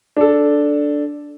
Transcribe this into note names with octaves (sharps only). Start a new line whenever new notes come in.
D4 A4